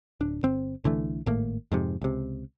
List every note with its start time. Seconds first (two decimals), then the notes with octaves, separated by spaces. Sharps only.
0.20 D1 D4
0.43 G1 C4
0.84 C2 D3 E3 A3
1.26 G#1 A2 A#3
1.72 F2 G#2 C3
2.02 C#2 C3